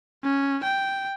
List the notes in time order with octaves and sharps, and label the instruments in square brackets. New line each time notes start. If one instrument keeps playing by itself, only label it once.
[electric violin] C#4
G5